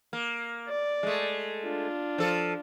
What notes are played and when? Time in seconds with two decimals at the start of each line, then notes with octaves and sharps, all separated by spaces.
0.13 A#3
0.68 D5
1.03 G#3 A3
1.62 D4 F4
2.18 F3 A4